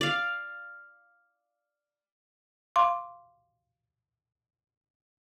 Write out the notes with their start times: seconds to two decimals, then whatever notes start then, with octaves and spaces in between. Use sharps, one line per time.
0.01 D5 F5
2.76 F5 C6 D6